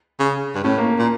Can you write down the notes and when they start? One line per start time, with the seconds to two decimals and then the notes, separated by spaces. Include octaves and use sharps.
0.20 C#3
0.55 G2
0.64 A2 C#4
0.78 A#3
0.99 A#2